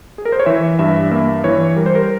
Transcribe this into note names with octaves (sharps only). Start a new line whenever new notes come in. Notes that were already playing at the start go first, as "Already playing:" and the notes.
G#4
A#4
C5
C#5
E3 E5
G2 E5
A#3 E5
E3 C#5
G3 A#4
C5
A#4